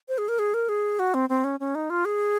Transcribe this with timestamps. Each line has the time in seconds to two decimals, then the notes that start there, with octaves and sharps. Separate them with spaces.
0.08 C5
0.18 G#4
0.28 A#4
0.39 G#4
0.54 A#4
0.69 G#4
0.99 F#4
1.14 C4
1.29 C4
1.44 C#4
1.60 C#4
1.75 D#4
1.90 F4
2.05 G#4